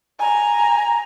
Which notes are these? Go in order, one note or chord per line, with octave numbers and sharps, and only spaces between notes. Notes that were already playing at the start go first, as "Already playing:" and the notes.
G#5 A#5